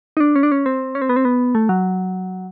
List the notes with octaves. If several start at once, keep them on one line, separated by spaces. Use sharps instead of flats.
D#4
D4
C#4
D4
C#4
C4
C#4
C4
B3
C4
B3
A3
F#3